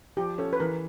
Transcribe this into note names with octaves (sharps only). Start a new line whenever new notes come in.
F3 G4
C#4 A4
B4
E3 A#4